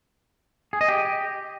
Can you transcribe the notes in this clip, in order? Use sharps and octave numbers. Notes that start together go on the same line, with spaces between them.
G#4
D#5
G4